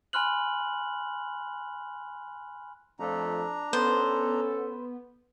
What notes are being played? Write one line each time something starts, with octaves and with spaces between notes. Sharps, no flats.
G#5 B5 C6 F6 F#6 F#7
F2 F3 A3 D4 A#5
B3 C#4 A4 C5